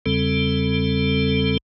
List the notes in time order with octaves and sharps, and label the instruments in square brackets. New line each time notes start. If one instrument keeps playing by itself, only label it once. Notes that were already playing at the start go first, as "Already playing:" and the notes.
[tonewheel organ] E2 C#3 G3 C4 A4